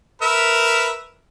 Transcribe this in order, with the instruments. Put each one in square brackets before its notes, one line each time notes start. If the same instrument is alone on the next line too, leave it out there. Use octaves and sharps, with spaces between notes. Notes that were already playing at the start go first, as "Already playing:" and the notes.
[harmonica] A#4 B4 E5